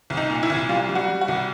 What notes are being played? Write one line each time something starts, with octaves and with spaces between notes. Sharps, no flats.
C2
D#4
A#2
E4
C2
G3 F4
G3
F#4
G3
F#4
C2